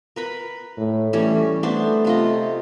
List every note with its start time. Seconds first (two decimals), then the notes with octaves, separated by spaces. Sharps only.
0.16 A#4 B4 B5
0.77 A2
1.13 E3 G3 A3 C#4
1.63 A3 B3 D4 C5
2.05 C3 F4 D#5